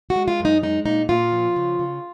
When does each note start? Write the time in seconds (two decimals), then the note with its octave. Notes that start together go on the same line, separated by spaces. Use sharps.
0.10 F#4
0.16 G#3
0.28 F4
0.40 F#2
0.45 D#4
0.63 G#3 D#4
0.86 A#2 D#4
1.09 A#2 F4
1.32 F3
1.56 C#3
1.79 C#3